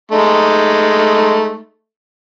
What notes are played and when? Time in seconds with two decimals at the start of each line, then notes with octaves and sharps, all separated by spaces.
0.12 G#3 A3 D#4